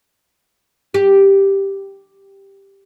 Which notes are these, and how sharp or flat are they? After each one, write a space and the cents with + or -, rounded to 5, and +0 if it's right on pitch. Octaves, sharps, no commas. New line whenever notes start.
G4 +0